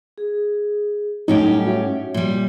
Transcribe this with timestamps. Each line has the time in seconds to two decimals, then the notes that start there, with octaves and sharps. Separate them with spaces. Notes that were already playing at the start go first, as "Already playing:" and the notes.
0.18 G#4
1.28 A2 F#3 G3 C#4 D#4 G4 C#5
1.67 F#4 C#5 E5
2.14 A#2 G3